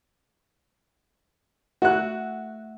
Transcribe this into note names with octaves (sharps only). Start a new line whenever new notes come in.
A3 F#4 E5 F#5 F#6